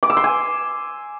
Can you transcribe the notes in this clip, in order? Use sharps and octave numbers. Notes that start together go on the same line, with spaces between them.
D6
E6
C6
G#5